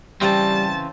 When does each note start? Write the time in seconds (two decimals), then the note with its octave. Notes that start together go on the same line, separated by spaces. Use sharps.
0.21 C#3 E3 G3 C4 A5